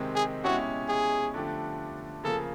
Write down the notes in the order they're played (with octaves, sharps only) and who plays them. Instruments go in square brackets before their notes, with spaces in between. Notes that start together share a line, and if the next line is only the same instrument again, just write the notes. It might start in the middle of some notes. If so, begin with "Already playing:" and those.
Already playing: [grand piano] C3 D#3 G#3 C4
[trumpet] G#4
[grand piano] B2 G#3 C#4 E4 G4 [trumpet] F#4
[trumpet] G#4
[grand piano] D3 F3 A3 D4 G4
[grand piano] C#3 F3 A#3 [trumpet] A4